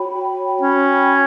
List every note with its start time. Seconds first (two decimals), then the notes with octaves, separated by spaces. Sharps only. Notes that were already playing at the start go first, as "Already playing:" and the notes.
Already playing: F#4 C#5 G5 B5
0.61 C#4